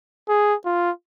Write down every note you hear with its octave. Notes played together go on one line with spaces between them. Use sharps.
G#4
F4